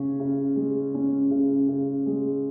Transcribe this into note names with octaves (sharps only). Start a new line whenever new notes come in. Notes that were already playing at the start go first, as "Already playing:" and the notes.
Already playing: C#3 C#4
C#3
G#3
C#4
C#3
C#3
G#3